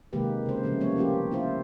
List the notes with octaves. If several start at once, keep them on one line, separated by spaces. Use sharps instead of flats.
C3 D#3 G#3 A#3 G4 B4
C#3 C5
C#3 F3 A3
G3 A#3 B3 C#5
F3 A#3 C#4 F4 G4
E4 F4 C5